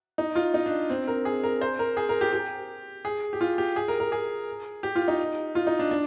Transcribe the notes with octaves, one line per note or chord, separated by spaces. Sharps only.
D#4
F4
D#4
D4
C4
A#4
G#4
A#4
C5
A#4
G#4
A#4
G4
G4
G#4
G4
F4
G4
G#4
A#4
A#4
G#4
G4
F4
D#4
F4
D#4
D4
D4